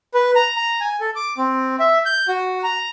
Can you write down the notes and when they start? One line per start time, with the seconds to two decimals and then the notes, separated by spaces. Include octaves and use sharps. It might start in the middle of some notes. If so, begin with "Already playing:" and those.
0.14 B4
0.36 A#5
0.56 A#5
0.81 G#5
1.00 A4
1.16 D6
1.38 C4
1.80 E5
2.06 G6
2.28 F#4
2.63 A#5